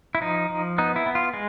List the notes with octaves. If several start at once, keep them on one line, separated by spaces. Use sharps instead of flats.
E4
F3 D#4
F3
B3 D#4
E4
B3
F4
G#3